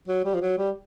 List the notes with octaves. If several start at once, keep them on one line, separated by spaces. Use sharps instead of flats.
F#3
G3
F3
F#3
G3